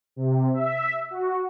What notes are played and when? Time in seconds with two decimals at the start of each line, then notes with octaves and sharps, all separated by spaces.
0.16 C3
0.54 E5
1.11 F#4